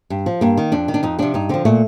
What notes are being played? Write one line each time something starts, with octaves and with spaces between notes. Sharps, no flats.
G2
F3
G2 A#3
D#3
F2 D4
D#3
D4
F2 D#4
C3 F3 D4
G2 D#4
D3 F3 C4
A#2 A3